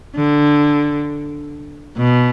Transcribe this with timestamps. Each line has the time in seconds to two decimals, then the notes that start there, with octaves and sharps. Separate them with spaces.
0.15 D3
1.97 B2